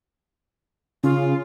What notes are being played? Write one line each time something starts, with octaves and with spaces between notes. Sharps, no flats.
C#3 F4